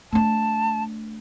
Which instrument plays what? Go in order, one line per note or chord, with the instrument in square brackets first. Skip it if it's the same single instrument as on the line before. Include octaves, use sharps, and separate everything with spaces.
[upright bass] A3 D4 [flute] A5